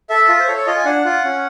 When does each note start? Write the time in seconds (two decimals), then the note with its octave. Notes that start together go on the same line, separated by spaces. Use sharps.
0.09 A4 E5
0.29 F4
0.40 C5
0.47 A4 C#5
0.57 C#5
0.66 F4 D#5
0.77 G#5
0.85 D4 F#5
1.05 F4
1.24 C#4